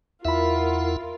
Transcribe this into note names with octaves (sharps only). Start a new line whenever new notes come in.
E2 E4 F4 A#4 E5 F#5 B5